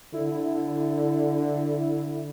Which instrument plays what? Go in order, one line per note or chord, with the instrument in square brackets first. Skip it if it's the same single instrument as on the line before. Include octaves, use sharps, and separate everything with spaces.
[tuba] D3 [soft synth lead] E4